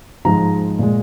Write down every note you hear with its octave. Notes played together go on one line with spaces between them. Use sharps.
G#2 F3 G#3 A#5
A#2 G#3